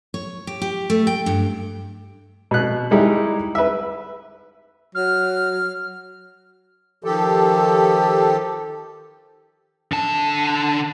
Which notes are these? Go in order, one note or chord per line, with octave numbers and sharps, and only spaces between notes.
C#5
G4
G4
A3
G5
G2
B2 F#6
G3 G#3 D#4 E4 G4
B4 E5
F#3 F6
D#3 F3 G4 A4
D3 A5